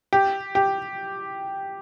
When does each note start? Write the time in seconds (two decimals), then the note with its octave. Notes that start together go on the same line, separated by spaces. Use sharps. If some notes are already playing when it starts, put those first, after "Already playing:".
0.13 G4
0.55 G4